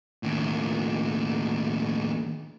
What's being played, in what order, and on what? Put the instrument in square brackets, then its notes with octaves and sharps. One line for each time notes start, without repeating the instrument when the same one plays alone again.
[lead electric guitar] D#2 A2